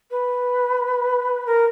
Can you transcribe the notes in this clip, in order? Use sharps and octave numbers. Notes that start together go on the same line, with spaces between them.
B4
A#4